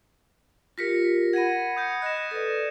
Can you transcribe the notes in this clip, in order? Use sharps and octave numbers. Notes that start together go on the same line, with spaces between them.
F4 G4 A#4 A#6 B6 C#7
F#5 B5 G#6 A#6 D#7
D#6 G6 C#7
D#5 F#6 A#6 E7
A4 B4 D5